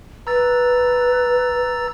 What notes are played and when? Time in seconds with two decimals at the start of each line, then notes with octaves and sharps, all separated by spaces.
0.27 B4 A#5 E6 A6